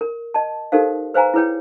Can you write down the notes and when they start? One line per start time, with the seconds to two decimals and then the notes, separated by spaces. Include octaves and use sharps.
0.01 A#4
0.34 D#5 A5
0.72 D#4 G4 A4 A#4 C5 F5
1.14 B4 C5 F5 G#5 A#5
1.34 E4 G#4 B4 C#5 G5